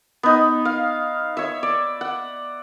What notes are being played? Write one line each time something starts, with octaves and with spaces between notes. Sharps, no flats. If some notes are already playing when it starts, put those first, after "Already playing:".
B3 D#4
F5
C#5 E5
D5
F#5